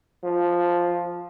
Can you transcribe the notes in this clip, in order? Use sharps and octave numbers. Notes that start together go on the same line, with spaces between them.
F3